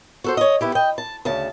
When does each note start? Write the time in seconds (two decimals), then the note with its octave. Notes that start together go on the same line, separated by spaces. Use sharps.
0.24 F#4 A4 C5
0.37 C#5 D#5
0.61 B3 E4 G4
0.75 D#5 G5
0.98 A5
1.25 D2 C#3 A5